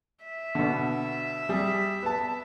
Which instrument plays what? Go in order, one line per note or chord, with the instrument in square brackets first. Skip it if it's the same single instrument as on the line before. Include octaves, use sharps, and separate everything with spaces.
[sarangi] E5
[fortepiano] B2 D3
G3 G#4
B3 A5